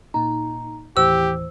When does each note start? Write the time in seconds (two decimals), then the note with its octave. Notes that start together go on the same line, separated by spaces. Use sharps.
0.14 A#2 D#4 A#5
0.97 D#2 A2 E3 G4 C5 E6